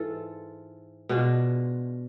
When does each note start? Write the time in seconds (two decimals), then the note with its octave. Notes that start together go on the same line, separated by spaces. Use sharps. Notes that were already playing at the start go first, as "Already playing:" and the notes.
Already playing: G#2 E3 F4 A4
1.09 B2 G#3 D4 F4